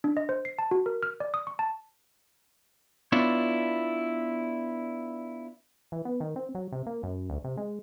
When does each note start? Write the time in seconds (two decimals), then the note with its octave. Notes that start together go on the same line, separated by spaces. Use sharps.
0.04 D4
0.17 D#5
0.29 C5
0.45 C7
0.59 A5
0.71 F#4
0.86 A#4
1.03 F6
1.20 D5
1.34 D#6
1.47 C#6
1.59 A5
3.12 B3 D4 E4 F4 C#5
5.92 E3
6.05 B3
6.20 D#3
6.36 C4
6.55 F#3
6.72 C3
6.86 A#3
7.03 F#2
7.29 D2
7.44 C3
7.57 G#3